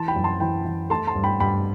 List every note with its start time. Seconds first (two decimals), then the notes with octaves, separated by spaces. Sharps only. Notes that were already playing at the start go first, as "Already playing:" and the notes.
Already playing: E3 A5 C6
0.08 G5 B5
0.16 F#2
0.24 A5 C6
0.40 E3 G5 B5
0.65 E3
0.90 A3 A5 C6
1.07 A5 C6
1.15 G2
1.24 G5 B5
1.40 G2 G5 B5